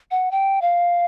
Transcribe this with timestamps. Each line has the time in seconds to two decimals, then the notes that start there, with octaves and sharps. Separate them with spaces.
0.11 F#5
0.31 G5
0.61 F5